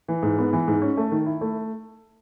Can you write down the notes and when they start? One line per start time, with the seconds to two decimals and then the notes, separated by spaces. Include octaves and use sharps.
0.08 E3
0.23 G#2
0.39 B3
0.53 E3
0.68 G#2
0.82 C#4
0.97 A3
1.12 D#3
1.26 E4
1.41 A3